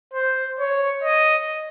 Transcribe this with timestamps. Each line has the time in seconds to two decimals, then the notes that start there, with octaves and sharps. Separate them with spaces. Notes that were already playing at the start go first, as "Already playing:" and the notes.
0.14 C5
0.59 C#5
1.04 D#5